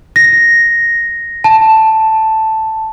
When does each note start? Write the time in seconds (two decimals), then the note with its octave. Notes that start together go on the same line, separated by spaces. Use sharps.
0.16 A#6
1.44 A5